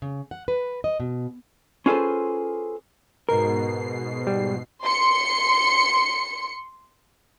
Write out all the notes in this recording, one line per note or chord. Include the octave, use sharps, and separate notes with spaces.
C#3
F#5
B4
D#5
B2
C#4 F4 G#4 A4 B4 C5
G#2 B2 A#4 C7
G3
C6 C#7